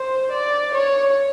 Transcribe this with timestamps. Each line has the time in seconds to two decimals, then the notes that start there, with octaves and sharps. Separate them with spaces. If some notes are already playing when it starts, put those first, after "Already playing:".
Already playing: C5
0.31 D5
0.74 C#5